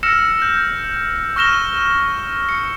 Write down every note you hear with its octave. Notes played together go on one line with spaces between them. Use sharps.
E6 F6 A#6 C#7 E7
G6
C#6 F6 A#6 E7 G7
C#7